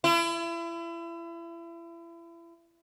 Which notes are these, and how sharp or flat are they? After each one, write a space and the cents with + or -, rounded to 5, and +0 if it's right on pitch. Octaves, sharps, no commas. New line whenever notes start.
E4 +35